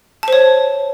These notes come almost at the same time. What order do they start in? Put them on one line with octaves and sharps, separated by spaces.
A5 C5 C#5